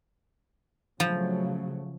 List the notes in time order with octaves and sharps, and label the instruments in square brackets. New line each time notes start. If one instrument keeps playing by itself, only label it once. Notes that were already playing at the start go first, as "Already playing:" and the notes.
[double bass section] C#3 F#3 A3 [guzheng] F3